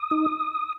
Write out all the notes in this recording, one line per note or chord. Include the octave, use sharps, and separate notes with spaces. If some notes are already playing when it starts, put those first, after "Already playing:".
Already playing: D#6
D#4